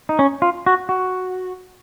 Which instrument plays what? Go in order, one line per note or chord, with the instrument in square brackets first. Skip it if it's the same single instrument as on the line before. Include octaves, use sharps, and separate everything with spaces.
[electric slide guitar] D#4
C#4
F4
F#4
F#4